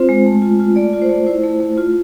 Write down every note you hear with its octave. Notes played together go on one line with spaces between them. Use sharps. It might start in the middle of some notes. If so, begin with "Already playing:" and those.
Already playing: C4 F4 C5
G#3
A3
F4
F4
A3 D5
F4
C5
A3
E4 C5
A3
A3
F4